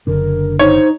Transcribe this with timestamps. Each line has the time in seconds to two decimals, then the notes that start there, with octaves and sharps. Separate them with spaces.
0.07 F#1 D3 D4 A#4
0.59 D#4 C5 C#5